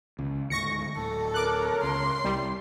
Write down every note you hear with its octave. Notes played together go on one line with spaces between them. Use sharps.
C#2
D2 G#2 C#6 A#6 C#7
D1 A4
A#4 C#5 D6 F#6
C#2 C6
C2 G3